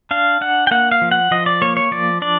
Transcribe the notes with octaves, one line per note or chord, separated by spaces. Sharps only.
D4 F5
D4 F#5
G5
A#3 F#5
F5
F3
F#5
F3 D#5
D5
A#3 C#5
C#5
F3 D5
D4 D5